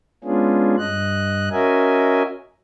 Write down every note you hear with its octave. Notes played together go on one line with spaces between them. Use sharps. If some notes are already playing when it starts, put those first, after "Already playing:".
G#3 B3 C#4 D4 F4 G#4
G2 D#5 F#6
C#4 F#4 A#4 D#5 E5 G#5